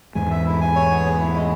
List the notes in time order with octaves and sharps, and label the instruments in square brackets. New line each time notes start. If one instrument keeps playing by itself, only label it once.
[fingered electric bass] E2 G#2 [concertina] G#5
[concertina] E5
E4
G#5
C#5
B3
G#4
E4
G#3